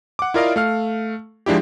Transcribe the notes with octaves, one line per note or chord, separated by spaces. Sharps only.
F#5 D6
E4 F4 A#4 D5 D#5 F5
A3 F5 F6
F3 G#3 D4 E4 G4